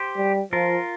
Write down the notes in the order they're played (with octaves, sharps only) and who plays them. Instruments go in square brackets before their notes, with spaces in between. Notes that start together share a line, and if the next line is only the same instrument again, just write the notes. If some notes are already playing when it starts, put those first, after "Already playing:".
Already playing: [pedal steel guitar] G4 C5
[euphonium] G3
[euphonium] F3 [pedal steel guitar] F4 A#4